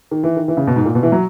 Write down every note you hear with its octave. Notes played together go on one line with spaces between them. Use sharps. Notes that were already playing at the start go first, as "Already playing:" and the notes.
D#3
E3
D#3
E3
C#3
B2
G#2
A#2
B2
E3
F#3